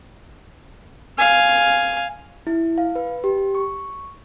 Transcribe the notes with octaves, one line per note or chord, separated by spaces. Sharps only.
F5 G#5
E4
F5
B4
G4
C#6